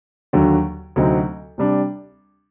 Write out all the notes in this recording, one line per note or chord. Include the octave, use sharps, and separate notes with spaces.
D#2 D3 F#3
D2 C3 F#3 C4 D#4
C3 G3 D4